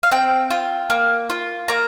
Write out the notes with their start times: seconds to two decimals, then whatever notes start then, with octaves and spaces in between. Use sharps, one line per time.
0.03 F5
0.11 C4 G5
0.50 F4
0.90 A#3
1.30 F4
1.68 A#3 A#5